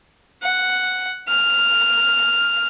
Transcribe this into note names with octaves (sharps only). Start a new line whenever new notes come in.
F#5
F6